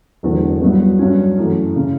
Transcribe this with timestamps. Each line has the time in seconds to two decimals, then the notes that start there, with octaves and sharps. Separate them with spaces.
0.23 E1 E2 D3 F#3 A3
0.61 G1 G2 F#3 B3
0.99 G2 F#3 C#4
1.37 F#2 E3 A3
1.76 C#3